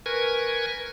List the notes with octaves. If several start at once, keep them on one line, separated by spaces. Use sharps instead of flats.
A#4 B4 G#5 C#6 G#6